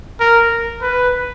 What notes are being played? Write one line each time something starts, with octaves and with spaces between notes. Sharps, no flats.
A#4
B4